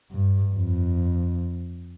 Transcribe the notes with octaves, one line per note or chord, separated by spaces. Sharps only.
G2
F2